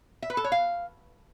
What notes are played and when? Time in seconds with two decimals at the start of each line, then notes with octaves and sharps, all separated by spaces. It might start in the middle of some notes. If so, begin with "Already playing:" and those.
0.22 E5
0.30 B4
0.37 A4
0.44 C#5
0.52 F5